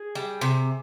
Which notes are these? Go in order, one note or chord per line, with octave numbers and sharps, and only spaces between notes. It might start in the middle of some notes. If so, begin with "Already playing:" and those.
Already playing: G#4
G3
C3